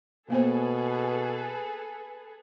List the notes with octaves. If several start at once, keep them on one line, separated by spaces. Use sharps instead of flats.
B2 A#3 B3 G#4 A4 B4 C5